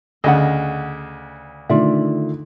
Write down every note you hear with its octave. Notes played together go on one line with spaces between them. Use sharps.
D2 C#3 D#5 F#5
D3 D#3 A3 F4 D5 E5